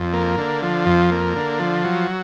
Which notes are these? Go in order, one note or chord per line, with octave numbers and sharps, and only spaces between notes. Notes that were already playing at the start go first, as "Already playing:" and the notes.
Already playing: F2
A#3
D3
F3
F2
A#3
D3
F3
F#3